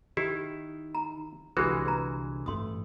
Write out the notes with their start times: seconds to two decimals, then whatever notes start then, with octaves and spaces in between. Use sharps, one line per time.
0.17 D#3 E4 G4
0.95 A#5
1.57 C2 D3 E3 G#3 F#4 G4 B4
1.85 B4 A#5
2.46 A1 G2 A3 C6 D#6